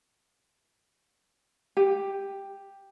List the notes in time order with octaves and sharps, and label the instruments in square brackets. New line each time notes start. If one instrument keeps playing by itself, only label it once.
[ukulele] G4